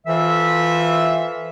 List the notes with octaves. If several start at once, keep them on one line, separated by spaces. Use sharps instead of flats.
E3 F4 A4 C5 E5